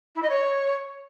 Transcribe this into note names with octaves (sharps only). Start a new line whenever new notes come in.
E4
D#5
C#5